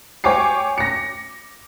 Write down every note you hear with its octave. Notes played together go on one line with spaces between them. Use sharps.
C#5 G5 G#5 D6 C7
A#6 C#7